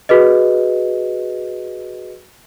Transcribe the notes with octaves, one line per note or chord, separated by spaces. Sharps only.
F#4 G#4 B4 D#5